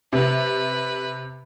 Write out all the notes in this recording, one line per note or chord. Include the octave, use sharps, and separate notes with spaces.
C3 B4